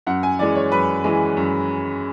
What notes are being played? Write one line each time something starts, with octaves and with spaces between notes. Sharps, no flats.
F#2 F#5
G#5
E3 G#3 D5
C#5
F#2 B4
E3 G#3
F#2